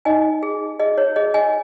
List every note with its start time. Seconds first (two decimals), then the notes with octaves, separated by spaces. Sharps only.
0.05 D#4 D#5 G#5
0.43 G#4
0.80 G#4 D#5
0.98 C#5
1.16 G#4 D#5
1.34 D#5 G#5